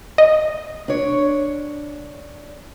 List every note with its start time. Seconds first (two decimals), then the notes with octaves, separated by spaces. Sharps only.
0.18 D#5
0.88 D4 C#5